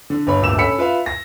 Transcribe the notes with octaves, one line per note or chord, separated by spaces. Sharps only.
D3
G1 C#5 B5
D1 G1 A#2 E6 E7
C#4 A4 B5 E6 B6 C#7
F4 B4 E5 F5
A#6